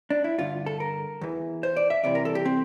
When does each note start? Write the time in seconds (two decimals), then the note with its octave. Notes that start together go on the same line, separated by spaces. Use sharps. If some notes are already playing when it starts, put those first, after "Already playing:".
0.10 D4
0.24 E4
0.38 G2 D3 F4
0.66 A4
0.80 A#4
1.21 E2 E3
1.63 C5
1.77 D5
1.90 E5
2.04 C2 C3 E3 D5
2.15 A#4
2.25 A4
2.35 G4
2.45 C4